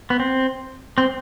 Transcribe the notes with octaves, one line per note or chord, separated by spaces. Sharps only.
B3
C4
C4